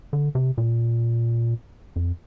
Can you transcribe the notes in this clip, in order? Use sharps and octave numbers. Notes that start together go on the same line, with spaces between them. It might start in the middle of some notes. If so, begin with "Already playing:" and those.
D3
C3
A#2
F2